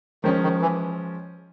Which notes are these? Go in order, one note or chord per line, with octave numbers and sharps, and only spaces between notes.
D#3 F3 G#3 C#4
D#3
E3